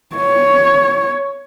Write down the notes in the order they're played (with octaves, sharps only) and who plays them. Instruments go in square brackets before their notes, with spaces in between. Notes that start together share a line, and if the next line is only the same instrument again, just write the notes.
[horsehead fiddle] C#5